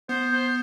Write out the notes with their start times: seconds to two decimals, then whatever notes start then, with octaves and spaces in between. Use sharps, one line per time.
0.09 B3 C5
0.31 C5